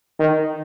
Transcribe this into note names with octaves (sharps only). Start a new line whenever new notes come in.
D#3